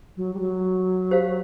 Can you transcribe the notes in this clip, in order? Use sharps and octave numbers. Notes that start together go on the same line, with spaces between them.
F#3
G3
F#3
G4 C5 F5